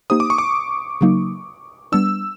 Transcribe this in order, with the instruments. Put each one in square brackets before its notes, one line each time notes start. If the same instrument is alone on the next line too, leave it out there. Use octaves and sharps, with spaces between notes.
[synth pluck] A#3 D#4 G4 C5 [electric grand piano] D#6
[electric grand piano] D6
C#6
D6
[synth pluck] C#3 F#3 A#3 D#4
[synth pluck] G3 B3 D4 [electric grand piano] E6